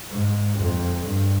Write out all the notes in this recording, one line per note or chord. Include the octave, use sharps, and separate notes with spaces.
G#2
F2
G2